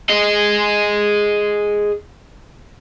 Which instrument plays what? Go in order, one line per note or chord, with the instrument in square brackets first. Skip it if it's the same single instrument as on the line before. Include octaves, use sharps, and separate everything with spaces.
[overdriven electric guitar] G#4 D#5